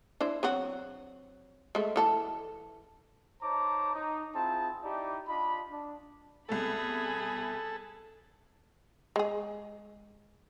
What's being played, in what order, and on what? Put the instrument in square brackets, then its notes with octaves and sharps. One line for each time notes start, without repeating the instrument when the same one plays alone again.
[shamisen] D4 E4 C5
F#3 C4 F#4
G#3 A3
E3 A4 A5
[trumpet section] D#4 C5 C#5 A5 A#5 D6
D#4
C4 E4 F4 G#4 A5
D#4 E4 G4 D5
D4 F4 D#5 B5
D4
[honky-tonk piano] C2 B2 A3 [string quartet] G#4 B5 [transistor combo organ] A4
[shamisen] G#3 G#4